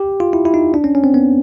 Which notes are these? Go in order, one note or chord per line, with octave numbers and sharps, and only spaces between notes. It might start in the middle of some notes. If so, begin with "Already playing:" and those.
Already playing: G4
F4
E4
E4
D#4
D4
C#4
C#4
C4
B3